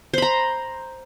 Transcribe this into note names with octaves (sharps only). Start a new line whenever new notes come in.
C5 A#5 B5